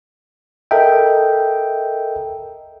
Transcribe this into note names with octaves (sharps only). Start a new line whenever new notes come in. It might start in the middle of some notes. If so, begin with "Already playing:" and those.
A4 A#4 D#5 E5 G5